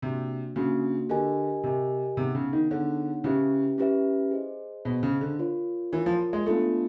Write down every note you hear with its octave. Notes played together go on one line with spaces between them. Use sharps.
C3 A#3 D4 F#4
C#3 A#3 D4 F#4
D3 G4 A#4 D#5 G#5
C3 G4 A#4 D#5 G#5
C3 B3 D#4 G#4 C#5 F#5
C#3
D#3
D3 B3 D#4 G#4 C#5 F#5
C#3 C#4 E4 G4 B4 E5
C#4 E4 G4 B4 E5
G#4 C5 D#5
B2 G#4 C5 D#5
C#3
D3
F4 A#4 C#5
E3 F4 A#4 C#5
F3
G#3
A3 B3 D4 F4 A4